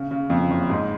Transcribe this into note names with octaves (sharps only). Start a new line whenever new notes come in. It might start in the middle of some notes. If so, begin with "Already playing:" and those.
Already playing: C#3
C#3
F2
F#1
G#2